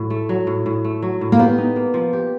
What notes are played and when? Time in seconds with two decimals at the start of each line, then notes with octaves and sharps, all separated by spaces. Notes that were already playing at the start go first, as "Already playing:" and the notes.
Already playing: A2 F#3
0.10 A3
0.29 F#3
0.47 A2
0.66 A2
0.84 A3
1.02 F#3
1.21 A2
1.32 A#3
1.39 B3 G4
1.58 D#4
1.76 A#3
1.94 F3
2.13 G4